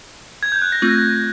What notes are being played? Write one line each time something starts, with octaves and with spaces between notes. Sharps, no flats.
G#6
G6
F#6
A#6
A3 C4 F4